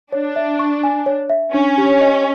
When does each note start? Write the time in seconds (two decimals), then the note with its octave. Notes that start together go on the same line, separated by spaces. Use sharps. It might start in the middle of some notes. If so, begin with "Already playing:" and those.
0.12 D4 C#5
0.36 E5
0.59 C#6
0.83 G#5
1.06 C#5
1.30 E5
1.53 C#4 D4
1.78 G4
2.01 D#5